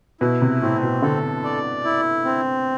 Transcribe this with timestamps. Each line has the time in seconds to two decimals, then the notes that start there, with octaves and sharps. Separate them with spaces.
0.21 B2 E4
0.42 C3
0.62 A2 C4
0.83 B2
1.02 D3 A4
1.44 D5
1.84 E4
2.25 C4